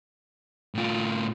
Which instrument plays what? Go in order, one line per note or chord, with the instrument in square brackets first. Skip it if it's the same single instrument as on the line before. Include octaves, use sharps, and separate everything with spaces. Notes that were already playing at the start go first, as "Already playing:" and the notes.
[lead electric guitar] A2 F4